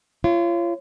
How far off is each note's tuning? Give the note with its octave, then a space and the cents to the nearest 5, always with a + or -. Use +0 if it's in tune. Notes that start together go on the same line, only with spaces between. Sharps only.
F4 -35 C#5 -10